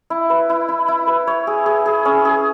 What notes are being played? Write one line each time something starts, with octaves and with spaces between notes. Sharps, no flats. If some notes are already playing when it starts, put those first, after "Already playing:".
E4
B4
E4
E4
E4
B4
C#5
G#4
G#4
G#4
C#4
G#4